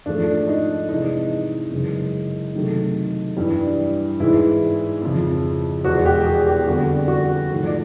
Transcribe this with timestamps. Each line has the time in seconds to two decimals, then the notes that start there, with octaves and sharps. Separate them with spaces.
0.06 G#2 F3 A3 D4
0.48 D#4
0.89 C3 E3 G#3 D#4
1.72 F#2 C#3 E3 G#3
2.54 C3 D#3 F#3 A3
3.37 G2 E3 G3
4.20 G#2 E3 G#3 E4
5.02 F2 C#3 F3
5.84 E2 B2 G#3 F#4
6.05 G4
6.26 G#4
6.47 G4
6.67 F2 D3 G3 F#4
7.08 F#4
7.50 G#2 F3 A3
7.66 D5